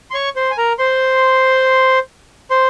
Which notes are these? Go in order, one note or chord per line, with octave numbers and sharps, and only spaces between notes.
C6
C#5 C#6
C5 C6
G#5
A#4 A#5
C5 C6
C5 C6